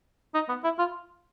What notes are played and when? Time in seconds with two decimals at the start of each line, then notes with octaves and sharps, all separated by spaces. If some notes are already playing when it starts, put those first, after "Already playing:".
0.34 D#4
0.49 B3
0.64 E4
0.79 F4